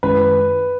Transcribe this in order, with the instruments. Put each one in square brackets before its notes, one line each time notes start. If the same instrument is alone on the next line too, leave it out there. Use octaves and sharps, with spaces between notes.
[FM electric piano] F#2 D#3 G#3 C#4 E4 [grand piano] B4